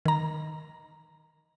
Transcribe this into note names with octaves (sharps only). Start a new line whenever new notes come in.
D#3 A#5